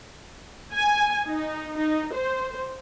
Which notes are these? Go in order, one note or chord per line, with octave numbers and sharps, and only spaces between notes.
G#5
D#4
D#4
C5